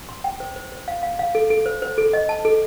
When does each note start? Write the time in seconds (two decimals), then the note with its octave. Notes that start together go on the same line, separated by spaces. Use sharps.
0.09 C6
0.24 G5
0.40 C5
0.56 C5
0.72 C5
0.88 F5
1.03 F5
1.19 F5
1.35 A4
1.50 A4
1.66 C5
1.82 C5
1.98 A4
2.13 D#5
2.29 A5
2.45 A4